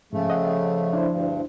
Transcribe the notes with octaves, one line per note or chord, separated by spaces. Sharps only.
G#2 C#3 F3 A3
D#5 F#5
D4 E4 C5
D2 G2